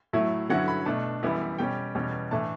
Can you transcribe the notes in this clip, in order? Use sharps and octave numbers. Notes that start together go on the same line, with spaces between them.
A2 F#3 A3 E4
G2 D3 F#3 C#4 E4 F#5
B5
B2 A3 D4 A5
F#2 E3 G3 B3 E4
B2 G3 C#4 G5
E2 B2 G3 C#4
A2 E3 A3 D4 A5